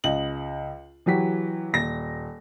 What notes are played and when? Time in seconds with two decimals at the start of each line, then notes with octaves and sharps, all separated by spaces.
0.04 C#2 D#5 F#7
1.06 E3 F#3 G4 B6
1.73 D#1 A#6